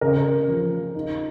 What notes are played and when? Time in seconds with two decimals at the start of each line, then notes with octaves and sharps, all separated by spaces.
0.01 C#3 A#4
0.48 F3
0.95 D#4